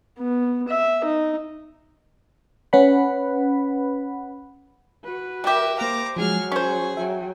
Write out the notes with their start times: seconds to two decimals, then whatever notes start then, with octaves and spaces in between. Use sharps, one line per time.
0.18 B3
0.68 E5
1.04 D#4
2.73 C#4 B4 F#5 B5
5.04 F#4 B4
5.44 G3 G4 A#4 E5
5.78 A#3 C5 F5 A#5 D6
6.16 F3 F#3 G#3 G#4 F6
6.52 C#4 G#4 C5 C#6
6.97 F#3 E5 G5